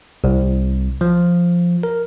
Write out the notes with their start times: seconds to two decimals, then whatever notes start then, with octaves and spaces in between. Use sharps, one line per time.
0.24 C2
1.01 F3
1.83 A#4